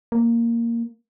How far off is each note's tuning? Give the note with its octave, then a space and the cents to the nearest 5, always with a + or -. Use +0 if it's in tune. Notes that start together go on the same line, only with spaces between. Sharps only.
A#3 -5